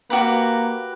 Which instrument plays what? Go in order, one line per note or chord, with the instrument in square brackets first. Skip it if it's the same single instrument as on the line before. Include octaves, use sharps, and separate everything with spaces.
[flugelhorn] A#3 [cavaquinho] F#4 G4 B4